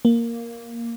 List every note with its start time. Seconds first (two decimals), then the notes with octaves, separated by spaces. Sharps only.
0.05 A#3